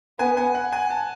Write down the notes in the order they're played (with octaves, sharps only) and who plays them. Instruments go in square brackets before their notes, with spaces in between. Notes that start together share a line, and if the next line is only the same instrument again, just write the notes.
[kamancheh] B3 [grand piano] G#5
[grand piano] G#5
F#5
G#5
A5